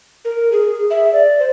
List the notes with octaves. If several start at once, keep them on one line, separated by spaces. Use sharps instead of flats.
A#4
G#4
E5
D5
C5